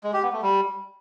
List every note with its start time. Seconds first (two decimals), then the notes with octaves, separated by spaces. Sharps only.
0.04 G#3
0.13 G4
0.23 B3
0.33 A3
0.42 G3